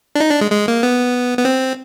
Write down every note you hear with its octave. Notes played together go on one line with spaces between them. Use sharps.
D4
D#4
D4
G#3
G#3
A#3
B3
B3
C4